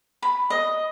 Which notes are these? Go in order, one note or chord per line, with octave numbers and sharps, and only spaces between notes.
B5
D#5